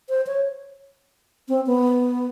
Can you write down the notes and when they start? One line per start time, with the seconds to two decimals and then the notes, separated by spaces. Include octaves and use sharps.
0.09 C5
0.27 C#5
1.48 C4
1.66 B3